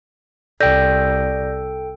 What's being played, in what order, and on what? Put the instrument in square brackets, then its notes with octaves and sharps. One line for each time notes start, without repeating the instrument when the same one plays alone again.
[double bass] C2 [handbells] A4 G5 [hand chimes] D5 G6 A#6